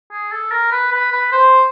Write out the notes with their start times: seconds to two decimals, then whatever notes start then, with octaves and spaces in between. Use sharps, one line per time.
0.11 G#4
0.32 A4
0.51 A#4
0.72 B4
0.92 B4
1.12 B4
1.32 C5